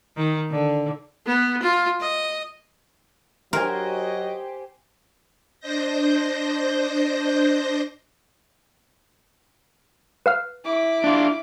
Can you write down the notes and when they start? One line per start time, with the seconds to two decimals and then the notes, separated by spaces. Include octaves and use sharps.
0.17 D#3
0.51 D3
1.26 B3
1.62 F4
2.00 D#5
3.53 F#3 F#4 G4 A#4 C5 D#5 G#5
5.60 D4 C5 D#5 G6 A#6
10.26 B4 F5 F6
10.64 E4 D6
11.04 D4 F4